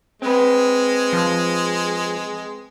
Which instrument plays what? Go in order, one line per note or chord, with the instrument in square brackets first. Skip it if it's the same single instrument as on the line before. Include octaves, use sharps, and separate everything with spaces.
[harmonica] G#3 [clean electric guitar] C4 B4
[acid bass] F3